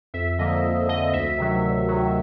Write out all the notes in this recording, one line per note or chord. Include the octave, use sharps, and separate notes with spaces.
F2 E5
D3 F3 A#3 D#5
F2
D3 F3 A#3 D#5
D2 E5
C3 D#3 F#3
D2
C3 D#3 F#3